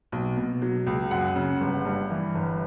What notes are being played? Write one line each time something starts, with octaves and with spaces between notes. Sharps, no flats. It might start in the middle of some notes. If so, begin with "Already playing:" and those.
B1
B2
F#3
C#2
F#2 F#5
C#3
G1
G2
E3
G1